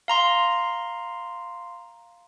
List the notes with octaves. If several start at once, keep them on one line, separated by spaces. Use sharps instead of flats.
F5 A#5 C6